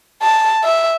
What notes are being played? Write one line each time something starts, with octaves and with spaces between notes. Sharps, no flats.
A5
E5